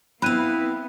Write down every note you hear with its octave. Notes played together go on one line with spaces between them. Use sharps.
B3 C4 E4 F5 B5 F#6 D#7